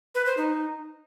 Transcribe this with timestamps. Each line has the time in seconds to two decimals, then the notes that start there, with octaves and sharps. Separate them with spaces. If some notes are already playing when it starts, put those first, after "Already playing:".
0.15 B4
0.26 C5
0.37 D#4